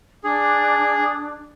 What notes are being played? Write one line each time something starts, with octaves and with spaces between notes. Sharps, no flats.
D4 G#4 D6